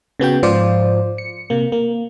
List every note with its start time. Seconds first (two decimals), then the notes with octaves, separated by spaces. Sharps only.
0.20 C#3 B3 F#4 G5
0.43 G#2 F3 F4 C5 D5
1.18 C#7
1.50 C3 A#3
1.72 A#3